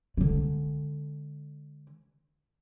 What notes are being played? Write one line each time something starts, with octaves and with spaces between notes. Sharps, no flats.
D3 G#3